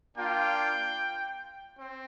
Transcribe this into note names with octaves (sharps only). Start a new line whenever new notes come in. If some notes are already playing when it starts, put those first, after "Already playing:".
A#3 D4 F4 G5
C4